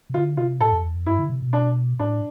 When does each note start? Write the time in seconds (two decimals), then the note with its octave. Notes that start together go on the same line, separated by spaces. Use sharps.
0.10 C3
0.14 D3 F4
0.37 C3 F4
0.60 A2 A4
0.72 F2
0.83 E2
0.95 F2
1.06 G2 E4
1.18 D3
1.30 C3
1.42 B2
1.53 D4
1.99 A2 D4